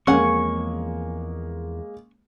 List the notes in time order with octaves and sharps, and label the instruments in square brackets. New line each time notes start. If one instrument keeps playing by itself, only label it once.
[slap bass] E2 F3 C4 [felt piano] G#3 A#3 [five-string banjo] C#4 F#5 [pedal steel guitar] C#6